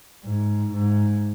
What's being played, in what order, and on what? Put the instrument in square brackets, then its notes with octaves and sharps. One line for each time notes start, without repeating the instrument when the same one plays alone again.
[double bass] G#2
G#2